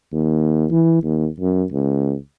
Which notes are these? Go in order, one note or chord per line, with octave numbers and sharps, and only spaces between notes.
D#2
E3
D#2
F#2
C#2